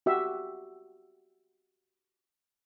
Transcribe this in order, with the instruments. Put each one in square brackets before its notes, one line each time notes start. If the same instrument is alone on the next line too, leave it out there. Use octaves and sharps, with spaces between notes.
[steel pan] F#4 G4 E5